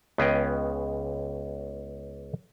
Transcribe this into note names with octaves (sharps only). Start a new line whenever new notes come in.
C#2 B3 C#4 G#4 D#5 G5